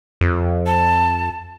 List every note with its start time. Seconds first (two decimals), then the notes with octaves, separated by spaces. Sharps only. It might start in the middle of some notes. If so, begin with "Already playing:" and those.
0.21 F2
0.67 A5